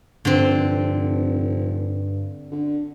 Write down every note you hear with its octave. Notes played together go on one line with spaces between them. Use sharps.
F1 G2 D3 C4
D3